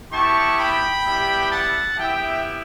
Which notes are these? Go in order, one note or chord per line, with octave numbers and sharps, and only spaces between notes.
B3 E4 G4 A5 C#6
G5 B5
G3 B3 E4 G4
F#5 A5
B3 E4 G4 E5 G5